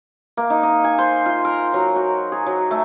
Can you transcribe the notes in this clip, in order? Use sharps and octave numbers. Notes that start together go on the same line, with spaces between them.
A#3
D#4
D#4
G#5
C5
F4
A#4
F#3
F#4
G#4
F#3
A3